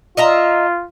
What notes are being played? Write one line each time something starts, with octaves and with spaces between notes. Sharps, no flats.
F4 D#5 E5 A#5